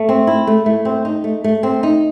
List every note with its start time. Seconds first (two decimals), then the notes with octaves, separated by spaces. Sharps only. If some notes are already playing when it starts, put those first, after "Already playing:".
Already playing: A3
0.09 C4
0.27 E4
0.47 A3
0.66 A3
0.85 C4
1.05 D#4
1.24 A3
1.44 A3
1.63 C4
1.83 D#4